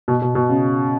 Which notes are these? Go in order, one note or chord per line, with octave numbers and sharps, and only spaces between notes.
B2
B2
B2
C#3